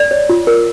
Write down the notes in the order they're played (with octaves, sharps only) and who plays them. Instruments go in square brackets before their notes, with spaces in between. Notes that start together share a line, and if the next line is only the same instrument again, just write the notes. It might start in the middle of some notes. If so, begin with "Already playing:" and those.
Already playing: [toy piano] D5
C#5
F4
A#4